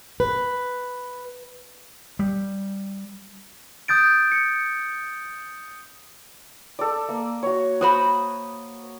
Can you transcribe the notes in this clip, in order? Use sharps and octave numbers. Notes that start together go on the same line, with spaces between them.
B4
G3
D#6 G6 A6 D7
C#7
A4 D5
A#3
F#4 C#5
F#4 C5 B5 D#6